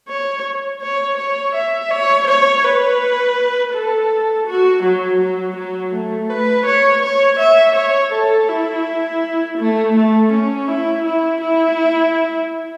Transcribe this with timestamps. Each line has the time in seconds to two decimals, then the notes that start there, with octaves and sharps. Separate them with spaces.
0.09 C#5
0.82 C#5
1.18 C#5
1.55 E5
1.90 C#5
2.28 C#5
2.64 B4
3.74 A4
4.47 F#4
4.83 F#3
5.21 F#3
5.56 F#3
5.94 A3
6.30 B4
6.66 C#5
7.02 C#5
7.39 E5
7.76 C#5
8.13 A4
8.49 E4
9.58 A3
9.96 A3
10.32 C#4
10.68 E4
11.05 E4
11.41 E4